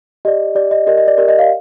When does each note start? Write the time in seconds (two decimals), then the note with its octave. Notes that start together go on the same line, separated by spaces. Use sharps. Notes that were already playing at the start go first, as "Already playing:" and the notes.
0.25 G4 D5 D#5
0.55 G4 D5
0.71 D#5
0.87 G4 A#4 D5 D#5
0.98 D#5
1.08 D5
1.18 G4 A#4 D5
1.28 D#5
1.39 F5